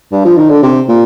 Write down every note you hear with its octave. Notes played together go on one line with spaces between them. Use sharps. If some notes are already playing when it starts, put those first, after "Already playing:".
G2
F3
D#3
D3
C3
A#2